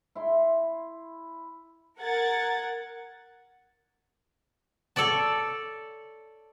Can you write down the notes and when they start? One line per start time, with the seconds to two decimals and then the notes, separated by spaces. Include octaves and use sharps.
0.15 E4 C6
2.00 A#4 F#5 G#6 A6
4.96 A4 C#5 D5 A5